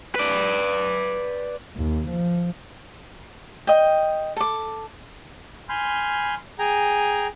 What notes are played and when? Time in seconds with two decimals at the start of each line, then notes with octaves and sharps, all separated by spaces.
0.15 B4 D5
1.77 D#2
2.09 F3
3.67 D#5 G5
4.37 A4 D6
5.69 G#5 B5 C6 F6 G6
6.59 G#4 G5 G#5 A#5